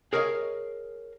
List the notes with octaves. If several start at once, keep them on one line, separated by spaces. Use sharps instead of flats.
G#4 A#4 C#5 D#5 F5